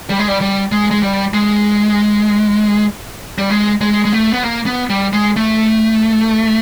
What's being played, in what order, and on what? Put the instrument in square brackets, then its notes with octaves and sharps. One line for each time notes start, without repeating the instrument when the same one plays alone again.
[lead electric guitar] G3
G#3
G3
G3
G#3
G#3
G3
G#3
G3
G#3
G#3
G#3
A3
B3
A#3
B3
G3
G#3
A3